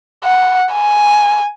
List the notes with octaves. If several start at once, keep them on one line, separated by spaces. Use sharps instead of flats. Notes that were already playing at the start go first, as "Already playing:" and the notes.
F#5
G#5